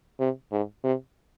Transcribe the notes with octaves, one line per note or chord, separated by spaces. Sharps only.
C3
G#2
C3